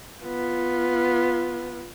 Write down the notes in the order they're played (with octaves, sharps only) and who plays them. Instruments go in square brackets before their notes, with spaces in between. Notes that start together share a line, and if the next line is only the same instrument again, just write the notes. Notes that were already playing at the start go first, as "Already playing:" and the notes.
[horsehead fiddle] B3 F4